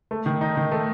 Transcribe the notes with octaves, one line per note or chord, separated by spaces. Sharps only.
A3
D#3
D#4
D#3
A3